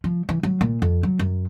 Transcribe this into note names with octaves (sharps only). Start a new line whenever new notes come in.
F3
E3
F#3
A#2
F2
F#3
F#2